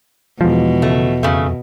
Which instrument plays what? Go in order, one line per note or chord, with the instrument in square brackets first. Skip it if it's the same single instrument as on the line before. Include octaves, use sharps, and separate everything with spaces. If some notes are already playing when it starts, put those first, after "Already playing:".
[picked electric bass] E2 F3 [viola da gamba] B2 [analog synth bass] G#3
[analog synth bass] C#3 [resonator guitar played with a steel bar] A3
[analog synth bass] F2 [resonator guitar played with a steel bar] C#3 A3